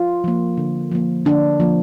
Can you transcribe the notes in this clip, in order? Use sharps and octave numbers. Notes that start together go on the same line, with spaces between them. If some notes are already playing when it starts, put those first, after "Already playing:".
Already playing: F4
F3 A#3
D3
F3 A#3
D3 D4
F3 A#3